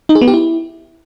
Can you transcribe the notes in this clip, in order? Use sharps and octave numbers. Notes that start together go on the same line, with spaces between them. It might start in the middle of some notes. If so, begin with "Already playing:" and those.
D#4
G#4
B3
G4
E4